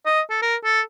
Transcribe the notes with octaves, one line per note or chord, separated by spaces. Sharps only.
D#5
A4
A#4
A4